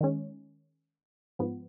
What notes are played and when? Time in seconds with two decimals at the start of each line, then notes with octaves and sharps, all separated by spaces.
0.01 D#3 G#3 C#4
1.39 G#2 F3 B3